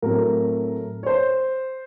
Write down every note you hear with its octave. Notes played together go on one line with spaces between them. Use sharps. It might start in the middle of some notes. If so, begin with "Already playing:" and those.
A2 F#3 A3 C4 A#4
C#5
C5